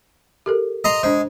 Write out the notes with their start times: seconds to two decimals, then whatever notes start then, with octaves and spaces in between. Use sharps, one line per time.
0.46 G4 A4 A#4
0.84 D#5 A#5 C6
1.03 G#3 D4 C5